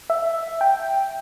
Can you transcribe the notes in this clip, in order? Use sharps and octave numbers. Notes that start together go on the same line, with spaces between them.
E5
G5